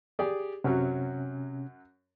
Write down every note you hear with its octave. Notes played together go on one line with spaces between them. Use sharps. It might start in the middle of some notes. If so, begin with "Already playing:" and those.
G4 G#4 D5
F#2 C3 F#3 C#4